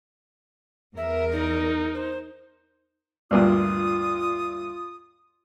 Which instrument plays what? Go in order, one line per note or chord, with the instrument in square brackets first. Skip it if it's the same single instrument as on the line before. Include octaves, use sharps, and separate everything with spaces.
[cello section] E2 A#4 [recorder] E5
[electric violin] D#4 [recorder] D5
[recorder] C5
[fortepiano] D2 G2 A#2 [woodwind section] F4 D#6